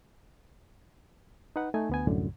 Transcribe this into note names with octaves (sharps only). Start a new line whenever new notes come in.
D#4 B4 F#5
A3 D#4 G#5
D2 B3 G#5
C2 F#2 A2 D3